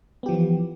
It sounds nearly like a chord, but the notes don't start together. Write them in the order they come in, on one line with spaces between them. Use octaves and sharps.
B3 G4 F3 E3